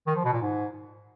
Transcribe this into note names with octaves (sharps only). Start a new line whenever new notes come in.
D#3
F3
B2
A#2
G#2